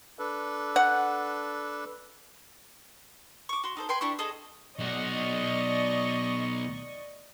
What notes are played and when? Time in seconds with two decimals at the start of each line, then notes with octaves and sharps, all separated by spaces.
0.19 D4 A4 B4
0.76 F#5
3.49 C#6 D6
3.64 F#4 C6
3.77 D#4 A4 C5
3.89 B4 G5 G#5 C6
4.01 D4 E4 G4 C#6
4.19 G#4 A4 D#5
4.79 B1 F#4 D5 D#5 C#6